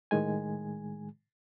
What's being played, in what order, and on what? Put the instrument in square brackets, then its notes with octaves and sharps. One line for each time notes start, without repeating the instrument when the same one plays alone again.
[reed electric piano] A2 D#3 G#3 G#5